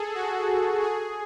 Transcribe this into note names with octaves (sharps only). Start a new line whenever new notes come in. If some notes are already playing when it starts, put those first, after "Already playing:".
Already playing: G#4 A4
F#4
G#4